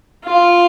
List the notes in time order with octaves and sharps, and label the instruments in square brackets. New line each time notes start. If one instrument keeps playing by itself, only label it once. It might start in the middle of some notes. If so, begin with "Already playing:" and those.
[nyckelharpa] F4